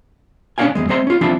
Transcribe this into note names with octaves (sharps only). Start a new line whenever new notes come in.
C#4 D4 G4 D5 F5 G#5
E2 G#3
G#3 C4 C5 E5 A#5 C6
C#4 F4
E3 F3 C4 D4 E4 F4